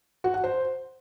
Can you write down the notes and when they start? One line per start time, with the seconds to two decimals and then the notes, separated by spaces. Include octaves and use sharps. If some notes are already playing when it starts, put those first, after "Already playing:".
0.24 F#4
0.34 F#5
0.44 C5